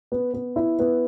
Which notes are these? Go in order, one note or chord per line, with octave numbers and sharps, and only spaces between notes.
B3
B3
E4
B3